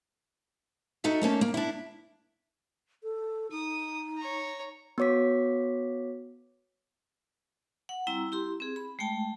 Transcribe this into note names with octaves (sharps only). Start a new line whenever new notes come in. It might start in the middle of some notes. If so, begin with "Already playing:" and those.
D#4 F#4 A4 E5
A3 A#3 C#4 A5
A#3
D4 E4
A4
D#4 D#6
C#5 A#5
B3 F#4 C#5 D6 B6
F#5
G3 C4 E4 A#5 E6
E4 G4 C6
C4 G#4
B5
G#3 A3 G5 A5